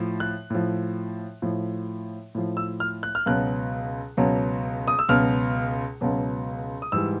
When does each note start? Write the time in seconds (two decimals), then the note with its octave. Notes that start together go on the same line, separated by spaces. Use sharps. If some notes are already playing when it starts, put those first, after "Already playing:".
Already playing: A2 F3
0.20 F#6
0.50 A2 F3
1.42 A2 F3
2.35 A2 F3
2.57 E6
2.80 F6
3.03 F#6
3.15 F6
3.26 C#2 B2 F#3 F#6
4.17 C#2 B2 F#3
4.88 D#6
4.99 E6
5.09 C#2 B2 F#3 F6
6.01 C#2 B2 F#3
6.82 D#6
6.92 G#2 E3 G3 E6